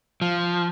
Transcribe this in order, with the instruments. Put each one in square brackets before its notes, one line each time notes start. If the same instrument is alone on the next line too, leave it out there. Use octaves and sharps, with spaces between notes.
[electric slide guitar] F3